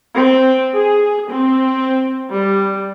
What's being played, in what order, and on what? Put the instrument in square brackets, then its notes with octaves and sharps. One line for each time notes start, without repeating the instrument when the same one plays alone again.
[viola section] C4
G#4
C4
G3